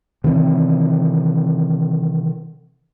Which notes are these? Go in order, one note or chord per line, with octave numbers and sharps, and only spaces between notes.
C3 D#3 E3 C4